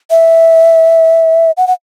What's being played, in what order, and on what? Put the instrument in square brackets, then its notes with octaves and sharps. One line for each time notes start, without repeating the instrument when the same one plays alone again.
[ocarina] E5
F#5
F#5